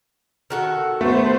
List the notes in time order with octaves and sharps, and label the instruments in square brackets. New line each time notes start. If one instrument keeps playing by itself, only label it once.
[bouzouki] D#3 F#4 A4
[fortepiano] A3 [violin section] B3 C5